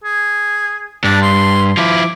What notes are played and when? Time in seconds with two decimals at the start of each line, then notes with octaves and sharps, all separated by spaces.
0.04 G#4
1.04 G2 D4
1.22 C6
1.77 F3 E4 D6